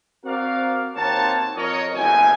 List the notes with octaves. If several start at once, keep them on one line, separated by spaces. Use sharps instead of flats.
C4 F#4 A#4 D5 F5
D#2 A#3 C4 F#4 C#5 A5
F2 A#4 C#5 D#5
F#1 D2 B2 G5 G#5